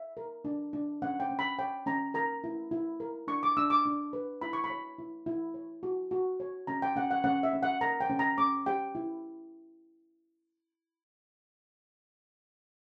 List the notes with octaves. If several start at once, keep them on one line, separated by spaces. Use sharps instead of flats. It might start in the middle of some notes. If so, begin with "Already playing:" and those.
Already playing: E5
A#4
D4
D4
C#4 F#5
G5
C#4
B5
C#5 G5
C#4 A#5
A#4 A#5
E4
E4
A#4
D4 C#6
D6
D4 E6
D6
D4
B4
E4 B5
C#6
B5
C#5
E4
E4
C#5
F#4
F#4
C#5
C#4 A#5
G5
C#4 F#5
F#5
C#4 F#5
E5
C#4
F#5
A#4 A#5
G5
C#4
A#5
C#4 D6
G4 G5
E4